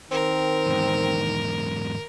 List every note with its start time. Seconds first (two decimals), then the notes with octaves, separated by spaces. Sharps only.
0.11 D#3 C4 A#4
0.66 E2 G#2